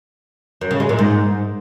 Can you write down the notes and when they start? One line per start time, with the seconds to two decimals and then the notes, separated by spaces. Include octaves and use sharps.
0.61 F#2
0.71 C#3
0.80 G#3
0.89 A#2
0.99 G#2